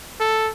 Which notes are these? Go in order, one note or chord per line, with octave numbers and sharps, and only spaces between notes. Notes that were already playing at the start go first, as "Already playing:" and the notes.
A4